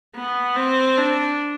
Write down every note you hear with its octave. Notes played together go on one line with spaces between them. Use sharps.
B3
C4
D4